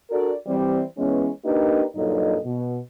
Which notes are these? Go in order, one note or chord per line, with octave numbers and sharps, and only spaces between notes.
D4 F#4 A4 A#4 D5
E3 G3 C4
E3 G#3 B3 C#4
A#3 D4 D#4 G4 A#4 B4
G2 A#2 F#3 D#4 A4 D#5
B2